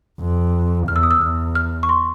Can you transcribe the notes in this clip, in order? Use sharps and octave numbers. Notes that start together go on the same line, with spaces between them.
F2
E2 F6
E6
D#6
E6
E2 F6
F6
C#6
C6